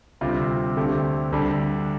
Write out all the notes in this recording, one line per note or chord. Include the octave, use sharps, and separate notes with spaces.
D2 C3 G3 C4 F4
D2 D3 A3 C4 G4
D2 D3 G3 D4